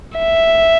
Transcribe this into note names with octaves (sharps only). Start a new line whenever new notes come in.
E5